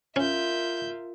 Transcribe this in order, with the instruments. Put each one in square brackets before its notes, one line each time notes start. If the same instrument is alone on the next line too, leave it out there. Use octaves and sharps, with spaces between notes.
[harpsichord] C#4 [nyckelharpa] F4 A#4 [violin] E5 G6